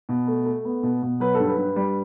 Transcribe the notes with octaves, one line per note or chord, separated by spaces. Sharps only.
B2
A3
A3
B3
B2
B2
F#3 B4
A4
G2
B4
G2
G3